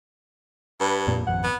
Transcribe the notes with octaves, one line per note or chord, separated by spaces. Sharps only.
G2 B4
F2 A#2 A#3
G#1 F2 F#5
B3